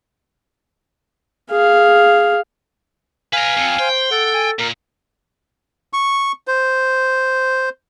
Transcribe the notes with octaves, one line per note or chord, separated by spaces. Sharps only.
G#4 F5
B4 F5 G#5 A#5
F2 C4
C5 G5
A4 F#5
G#5
A#2 A#4
C#6
C5